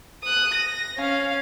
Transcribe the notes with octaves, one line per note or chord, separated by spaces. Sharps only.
D#6 F#6
A#6
C#4 F5